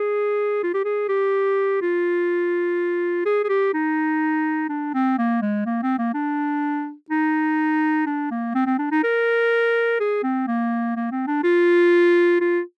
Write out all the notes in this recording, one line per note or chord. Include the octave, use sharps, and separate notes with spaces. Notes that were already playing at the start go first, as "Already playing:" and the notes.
Already playing: G#4
F4
G4
G#4
G4
F4
G#4
G#4
G4
D#4
D4
C4
A#3
G#3
A#3
C4
A#3
D4
D#4
D4
A#3
C4
C4
D4
D#4
A#4
G#4
C4
A#3
A#3
C4
D4
F4
F4